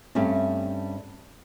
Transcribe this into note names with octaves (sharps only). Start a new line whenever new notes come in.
G2 G3 A3 C4 C#4